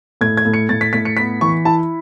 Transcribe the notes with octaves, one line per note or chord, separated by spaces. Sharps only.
A2 G#6
G#6
A2
C#7
A2 A6
B6
A2 B6
C#7
B3 B6
E3 C#6
E4 A5